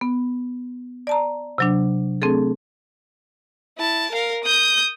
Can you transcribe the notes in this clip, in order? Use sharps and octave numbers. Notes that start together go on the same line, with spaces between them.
B3
D5 A5 A#5
C3 F#3 D4
A3 C4 D4 G#4 A4
E4 A5
A#4 F5
D#6 G6